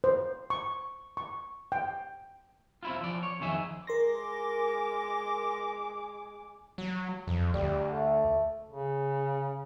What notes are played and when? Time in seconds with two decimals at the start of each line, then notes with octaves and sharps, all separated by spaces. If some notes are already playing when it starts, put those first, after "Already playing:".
0.04 C5
0.50 C#6
1.17 C#6
1.72 G5
2.83 C4 E4 F4
3.01 F3 D5
3.23 C#5
3.40 F2 D#3 G#4 E5
3.87 G#3 A#4 C6 D6 A#6
6.78 F#3
7.27 F2
7.54 D2 G3
7.93 A3
8.69 C#3